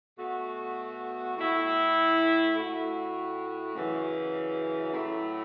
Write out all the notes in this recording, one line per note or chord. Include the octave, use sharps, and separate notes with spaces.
B2 A3 F#4
A2 A3 E4
A2 A3 F#4
F#2 C#3 E3
A2 F#3 A3